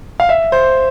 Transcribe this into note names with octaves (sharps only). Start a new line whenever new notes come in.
F5
E5
C5